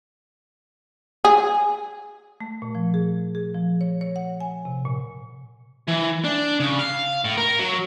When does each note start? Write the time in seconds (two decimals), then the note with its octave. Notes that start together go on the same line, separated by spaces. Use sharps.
1.25 G#4
2.40 A3
2.62 A#2
2.75 F3
2.94 G#4
3.35 G#4
3.55 F3
3.81 C#5
4.01 C#5
4.16 F#5
4.41 G#5
4.65 C3
4.85 A#2
5.88 E3
6.25 D4
6.60 C#3
6.79 F5
7.24 A2
7.37 A#4
7.59 F#3